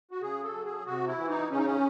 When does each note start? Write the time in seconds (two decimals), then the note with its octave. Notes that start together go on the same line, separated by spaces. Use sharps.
0.11 F#4
0.21 C#3 G#4
0.43 A4
0.54 F#3
0.65 G#4
0.86 C3 F#4
1.07 E4
1.18 E3
1.29 D#4
1.51 C#3 C#4
1.58 D#4
1.65 C#4